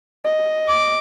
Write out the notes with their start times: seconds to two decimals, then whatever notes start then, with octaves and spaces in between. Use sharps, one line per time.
0.24 D#5
0.68 D6